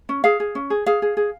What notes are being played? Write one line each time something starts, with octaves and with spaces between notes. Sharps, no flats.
C#4
G#4 F5
G#4
C#4
G#4
G#4 F5
G#4
G#4